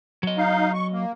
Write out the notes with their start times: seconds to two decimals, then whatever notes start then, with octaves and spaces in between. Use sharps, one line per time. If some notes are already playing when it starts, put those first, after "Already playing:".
0.23 F#3 D#5
0.38 D#4 F5
0.74 C#6
0.93 A#3